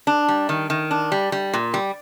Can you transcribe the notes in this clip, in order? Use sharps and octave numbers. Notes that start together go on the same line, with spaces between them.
D4
G3
D#3
D#3
D4
G3
G3
A#2
G3